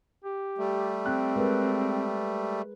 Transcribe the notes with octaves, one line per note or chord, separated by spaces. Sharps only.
G4
G3 A3
C4 F#6
G#3 A#4 B4